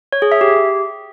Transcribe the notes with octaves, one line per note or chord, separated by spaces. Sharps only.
C#5
G#4
E5
G4